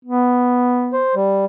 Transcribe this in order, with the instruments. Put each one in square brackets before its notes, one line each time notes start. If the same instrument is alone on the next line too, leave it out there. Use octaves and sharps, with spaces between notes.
[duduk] B3
[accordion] C5
G3